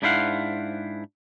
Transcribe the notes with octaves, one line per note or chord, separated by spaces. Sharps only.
G#2 D4 E4 C5 F5 F#5